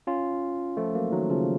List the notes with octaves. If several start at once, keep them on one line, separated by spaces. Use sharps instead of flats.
C#4 F4
F3 A3
F#3 A#3
D#3 F#3
C#3 F3